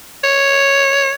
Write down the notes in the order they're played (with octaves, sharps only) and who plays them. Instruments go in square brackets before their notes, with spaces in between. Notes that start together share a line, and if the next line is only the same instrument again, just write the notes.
[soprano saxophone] C#5